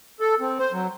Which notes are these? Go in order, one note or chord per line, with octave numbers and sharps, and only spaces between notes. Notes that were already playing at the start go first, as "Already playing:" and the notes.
A4
C4
C5
F#3